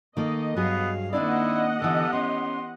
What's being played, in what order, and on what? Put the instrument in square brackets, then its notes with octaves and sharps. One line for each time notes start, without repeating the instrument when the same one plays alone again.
[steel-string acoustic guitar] D#3 A#3 A4 [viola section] D#5
[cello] G2 F5 [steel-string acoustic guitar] F#3 G#4 [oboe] B3
[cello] D#3 A#3 [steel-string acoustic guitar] C4 D4 D5 [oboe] E4 [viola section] D#5 F#5
[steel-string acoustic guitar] D3 E3 [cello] B3 G4 [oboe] A4
[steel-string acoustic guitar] C#4 [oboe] C6